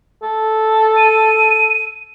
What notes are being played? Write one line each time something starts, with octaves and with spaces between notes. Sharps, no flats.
A4
D#7